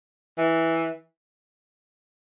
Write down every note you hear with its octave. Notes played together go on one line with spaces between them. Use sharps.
E3